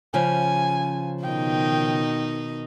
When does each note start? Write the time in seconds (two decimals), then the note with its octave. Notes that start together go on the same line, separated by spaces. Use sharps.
0.14 C#3 F3 C#4 G#5
1.23 B2 D#3 D#4 G5